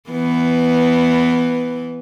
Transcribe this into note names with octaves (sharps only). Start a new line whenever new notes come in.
E3 B3